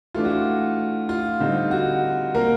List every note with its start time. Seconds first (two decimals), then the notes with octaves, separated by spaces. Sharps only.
0.14 E3 A3 D4 F4
0.25 F#4
1.09 F4
1.40 D3 G3 C4 D#4
1.71 F#4
2.35 A#3 A#4